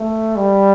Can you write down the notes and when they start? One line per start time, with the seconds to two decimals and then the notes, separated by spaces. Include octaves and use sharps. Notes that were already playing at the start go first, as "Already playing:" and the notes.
Already playing: A3
0.36 G3